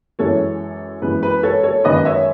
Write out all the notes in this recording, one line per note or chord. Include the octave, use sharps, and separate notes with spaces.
F#2 E3 G#3 A4 C#5
F#2 E3 G#3 B4
B4
A4 C#5
A4 C#5
F#2 D#3 G#3 B4 D#5
C#5 E5